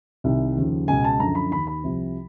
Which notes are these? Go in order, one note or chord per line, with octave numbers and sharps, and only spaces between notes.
C2 C3 D#3
D#2 C#3 F3
C#2 B2 G#5
A5
F#2 D3 F3 A#5
B5
D#2 D#3 B5
B5
C2 C3 F3